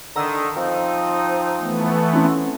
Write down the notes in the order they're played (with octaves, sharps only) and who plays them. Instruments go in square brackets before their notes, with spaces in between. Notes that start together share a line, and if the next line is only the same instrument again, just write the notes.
[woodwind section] D3 D#3 [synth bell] A#5 E6
[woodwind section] F3 C4 D#4
[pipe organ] E3 A3 B3
[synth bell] C4 C#4 E4